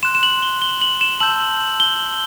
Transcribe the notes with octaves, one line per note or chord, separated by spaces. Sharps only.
C6 F#6 E7
E7
F#7
G7
G7
F#7
E7
A5 E6 G6 F#7
G7